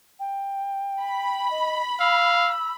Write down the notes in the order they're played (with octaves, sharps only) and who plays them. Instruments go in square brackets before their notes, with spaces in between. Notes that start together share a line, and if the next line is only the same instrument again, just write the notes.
[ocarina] G5
[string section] B5
[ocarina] D#5
[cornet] F5 [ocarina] E6